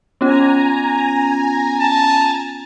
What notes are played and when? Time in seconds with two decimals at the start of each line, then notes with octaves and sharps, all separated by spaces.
0.21 B3 C#4 F4 G#5 A#5
1.80 A5